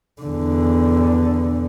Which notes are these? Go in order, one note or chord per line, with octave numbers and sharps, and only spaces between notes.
E2 D3